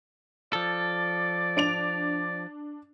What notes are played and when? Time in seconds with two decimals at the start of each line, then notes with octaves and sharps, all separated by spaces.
0.53 F3 A4 D5
1.57 D4 D7 F7